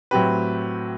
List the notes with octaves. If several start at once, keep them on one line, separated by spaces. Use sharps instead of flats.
A2 F#3 C4 G4 B4